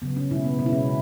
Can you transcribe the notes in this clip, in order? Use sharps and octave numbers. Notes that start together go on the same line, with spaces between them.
C#3 F#3 B3
C#4
B2 G#3 E4
B3
B2 G#3 B3
E4
C#4
C#3